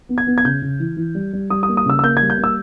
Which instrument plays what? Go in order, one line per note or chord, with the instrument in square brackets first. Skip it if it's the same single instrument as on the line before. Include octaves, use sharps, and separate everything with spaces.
[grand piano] B3
G#6
B3
G#6
C#3 G6
C#3
E3
E3
G3
G3
G3 D#6
D#6
A#3
D#6
C#3 E6
E6
A#3 G6
G#6
G3
G6
A#3
E6